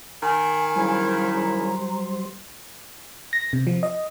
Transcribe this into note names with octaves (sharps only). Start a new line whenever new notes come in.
D#3 G#5
A#2 C#3 F#3 G3 E4 C5
A#5
A#6
C3
F3
D#5